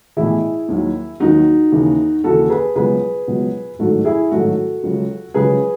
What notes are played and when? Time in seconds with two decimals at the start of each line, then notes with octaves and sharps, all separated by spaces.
0.17 B1 A2 E3 E4 G#4
0.68 D#2 D#3 F#3
1.20 D#2 D#3 F#3 D#4 F#4
1.72 D#2 C#3 E3
2.24 D#2 C#3 E3 F#4 A4
2.50 G#4 B4
2.75 C#2 B2 F#3 G#4 B4
3.27 C#2 B2 F#3
3.79 A1 G#2 D#3 F#3 F#4 A4
4.05 E4 G#4
4.31 A1 G#2 D#3 F#3 F#4 A4
4.83 C#2 C#3 F#3
5.34 C#2 C#3 F#3 G#4 B4